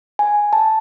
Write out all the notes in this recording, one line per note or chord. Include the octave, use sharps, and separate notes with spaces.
G#5
A5